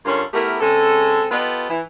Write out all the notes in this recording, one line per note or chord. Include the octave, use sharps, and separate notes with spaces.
G2 D3 C#4 F4 A#4
A3 B3 E4 G4 A#4
C#3 G#3 C4 A4
B3 F4 G4 A4 B4 D#5
E3